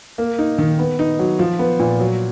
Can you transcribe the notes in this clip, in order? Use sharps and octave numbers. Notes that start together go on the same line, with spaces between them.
A#3
D#4
D#3
B3
D#4
F#3
F3
B3
A#2
F#3